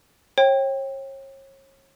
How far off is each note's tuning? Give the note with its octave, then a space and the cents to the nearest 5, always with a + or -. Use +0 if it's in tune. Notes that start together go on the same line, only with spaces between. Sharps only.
C#5 -35 G5 +0